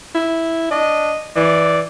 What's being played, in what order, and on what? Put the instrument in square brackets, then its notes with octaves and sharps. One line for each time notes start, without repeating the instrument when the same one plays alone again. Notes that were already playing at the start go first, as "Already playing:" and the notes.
[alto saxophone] E4
[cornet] D4 [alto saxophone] D#5
[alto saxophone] E3 [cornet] D5